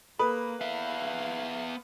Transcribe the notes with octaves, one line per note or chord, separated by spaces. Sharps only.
A#3 A4 B4 B5
B3 E5 F5